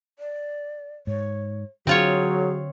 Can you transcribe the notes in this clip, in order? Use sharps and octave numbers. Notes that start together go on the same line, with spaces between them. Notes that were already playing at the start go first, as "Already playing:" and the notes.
D5
G#2 C#5
D3 F#3 C4 D4 F4 G#4 C#5